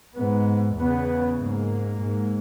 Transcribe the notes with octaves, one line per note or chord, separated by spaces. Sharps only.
G#2 B3
E2 C#3 B3
G#2 A#3
G#2